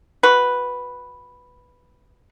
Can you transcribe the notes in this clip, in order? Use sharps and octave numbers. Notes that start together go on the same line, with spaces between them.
F#4 B4